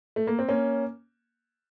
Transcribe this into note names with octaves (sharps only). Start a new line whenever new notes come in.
A3
A#3
C4
A#3 C#4